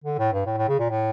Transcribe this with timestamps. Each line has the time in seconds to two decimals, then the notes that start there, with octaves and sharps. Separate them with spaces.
0.04 D3
0.18 A2
0.33 G2
0.46 A2
0.57 A2
0.69 C#3
0.79 A#2
0.90 A2